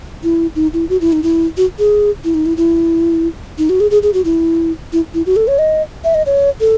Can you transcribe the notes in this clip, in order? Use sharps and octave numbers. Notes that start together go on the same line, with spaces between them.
E4
D#4
E4
F#4
E4
D#4
E4
F#4
G#4
E4
D#4
E4
E4
D#4
F#4
G#4
G#4
G#4
F#4
E4
E4
E4
F#4
A4
C#5
D#5
E5
D#5
C#5
A4